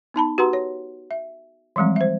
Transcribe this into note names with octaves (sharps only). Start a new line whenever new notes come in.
B3 D#4 A5 B5
F#4 G4 B4 F#5 A#5 C6
C#5
E5
E3 F3 G3 G#3 C4
C5 E5